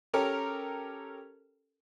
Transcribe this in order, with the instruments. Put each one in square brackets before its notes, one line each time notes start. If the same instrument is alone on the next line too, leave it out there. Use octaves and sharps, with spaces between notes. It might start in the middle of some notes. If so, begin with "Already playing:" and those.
[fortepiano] C#4 G4 A4 A#4